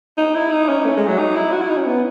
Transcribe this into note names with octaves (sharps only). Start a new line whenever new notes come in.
D#4
E4
D#4
C#4
A3
G#3
F#3
D#4
E4
F#4
E4
D#4
C#4
B3